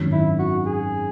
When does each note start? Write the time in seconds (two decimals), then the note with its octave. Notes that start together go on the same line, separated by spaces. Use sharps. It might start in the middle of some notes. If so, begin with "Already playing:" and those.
Already playing: G#1 F#2 D#3 F#3
0.12 E4
0.39 F#4
0.66 G#4